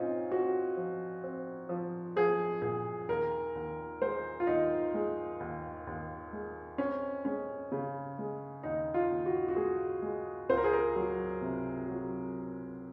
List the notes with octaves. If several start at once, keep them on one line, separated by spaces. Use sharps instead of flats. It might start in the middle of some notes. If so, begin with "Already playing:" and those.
Already playing: A#2 C4 C#4 D#4 F4
C4 F#4
F3
C4
F3
F3 G#4
A#2 G#4
D#2 A#4
D#2
G#3 C5
F4
D#2 D#4
G#3
D#2
D#2
G#3
C4 C#4
G#3 C#4
C#3
G#3
D#2 D#4
F4
D#2
F#4
F#4
G#3 G#4
G#3
C#2 C5
A#4
G#4
A#4
F#3
C3
F#3